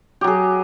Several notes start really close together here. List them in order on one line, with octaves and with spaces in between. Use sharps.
G4 F#3 G#4